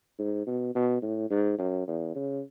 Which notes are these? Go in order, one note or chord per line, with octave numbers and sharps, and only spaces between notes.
G#2
B2
B2
A2
G#2
F#2
E2
C#3